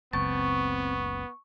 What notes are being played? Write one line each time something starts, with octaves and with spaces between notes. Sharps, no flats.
F#1 C#2 B3 C4 G5 A5 C#6